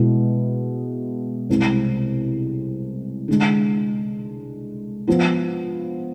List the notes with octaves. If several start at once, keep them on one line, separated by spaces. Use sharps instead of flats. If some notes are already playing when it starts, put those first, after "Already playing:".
Already playing: B2 G#3 B3 E4
C2 C3 G#3 C4
D3 G#3 D4
F3 B3 F4